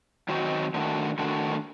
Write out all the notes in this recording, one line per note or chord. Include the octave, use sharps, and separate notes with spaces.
D#3 F#3 C4 D#4 F#4
D#3 A3 D4 F#4
D#3 A3 D4 F#4